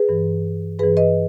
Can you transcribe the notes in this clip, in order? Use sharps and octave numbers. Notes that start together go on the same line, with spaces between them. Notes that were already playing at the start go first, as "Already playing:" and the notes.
Already playing: G#4 B4
G2 E3
G2 E3 G#4 B4
B4 D#5